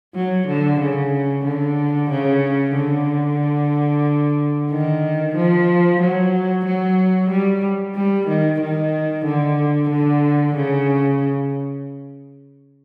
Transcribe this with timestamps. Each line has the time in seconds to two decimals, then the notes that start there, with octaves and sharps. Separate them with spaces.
0.15 F#3
0.48 D3
0.80 C#3
1.45 D3
2.10 C#3
2.75 D3
4.70 D#3
5.36 F3
6.01 F#3
6.66 F#3
7.31 G3
7.95 G3
8.28 D#3
8.61 D#3
9.25 D3
9.90 D3
10.56 C#3